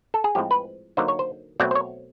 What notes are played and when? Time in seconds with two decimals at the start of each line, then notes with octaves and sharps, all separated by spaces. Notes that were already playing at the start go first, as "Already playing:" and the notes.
0.14 A4
0.24 G#4
0.35 A2 F3 G#3 C4 G4
0.51 B4
0.97 D3 F#3 A#3 D#4 C5
1.08 C#5
1.19 C5
1.60 B2 F#3 A3 C4 D5
1.71 C5
1.75 C#5